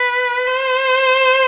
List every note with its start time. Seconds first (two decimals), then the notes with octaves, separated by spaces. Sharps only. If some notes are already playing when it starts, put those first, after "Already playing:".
Already playing: B4
0.47 C5